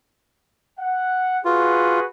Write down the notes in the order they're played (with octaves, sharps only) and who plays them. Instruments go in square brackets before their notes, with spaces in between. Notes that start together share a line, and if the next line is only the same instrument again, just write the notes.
[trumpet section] F#5
[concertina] F4 [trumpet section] F#4 G#4 B4